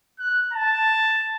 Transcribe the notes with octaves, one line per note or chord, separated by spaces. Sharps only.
F#6
A5